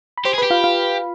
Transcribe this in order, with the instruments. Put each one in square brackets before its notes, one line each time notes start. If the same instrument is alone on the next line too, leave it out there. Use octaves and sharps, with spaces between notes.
[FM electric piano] B5
[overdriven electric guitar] G4 [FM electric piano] C5 C6
[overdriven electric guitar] G#4
[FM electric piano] B4 B5
[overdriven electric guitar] G4
[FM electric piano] F4 F5
F4 F5